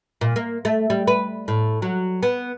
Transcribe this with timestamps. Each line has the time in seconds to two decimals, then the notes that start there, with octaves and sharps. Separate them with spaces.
0.21 A#2
0.36 A#3
0.65 A3
0.90 G3
1.07 B4
1.48 A2
1.82 F#3
2.23 B3